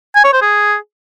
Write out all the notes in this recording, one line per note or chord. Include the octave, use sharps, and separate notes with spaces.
G#5
C#5
C5
G#4